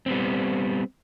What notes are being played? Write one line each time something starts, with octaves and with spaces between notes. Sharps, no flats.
G3 B3 C4